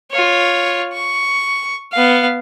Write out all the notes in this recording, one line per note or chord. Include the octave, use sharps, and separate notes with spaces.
F4 C#5
C#6
B3 F5